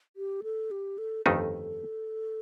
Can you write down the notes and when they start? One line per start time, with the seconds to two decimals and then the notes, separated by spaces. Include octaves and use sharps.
0.17 G4
0.43 A4
0.71 G4
0.98 A4
1.26 G1 F2 D#3 A3 D#4 A4